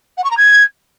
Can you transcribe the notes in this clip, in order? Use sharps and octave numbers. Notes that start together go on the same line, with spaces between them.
F#5
C#6
A#5
G#6